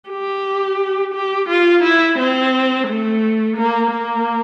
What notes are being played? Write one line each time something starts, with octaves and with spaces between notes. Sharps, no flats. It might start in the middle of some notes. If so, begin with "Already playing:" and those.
G4
G4
F4
E4
C4
A3
A#3
A#3